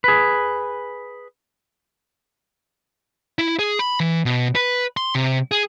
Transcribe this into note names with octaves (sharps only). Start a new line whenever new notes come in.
G#4 B4
E4
G#4
B5
E3
B2
B4
C6
C3
G#4